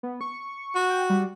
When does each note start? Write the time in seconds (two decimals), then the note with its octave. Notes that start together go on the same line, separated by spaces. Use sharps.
0.03 B3
0.21 C#6
0.75 F#4
0.90 G5
1.10 G3